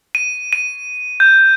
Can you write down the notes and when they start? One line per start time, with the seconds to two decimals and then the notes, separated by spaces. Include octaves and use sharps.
0.15 D#7
0.53 D#7
1.20 G6